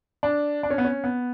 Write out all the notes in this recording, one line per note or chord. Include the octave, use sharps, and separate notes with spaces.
D4
D4
C#4
B3
C#4
B3